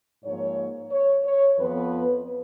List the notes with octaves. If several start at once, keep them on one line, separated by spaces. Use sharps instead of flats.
G#2 F3 A#3 C#5
C#5
C#5
F2 F3 B3 B4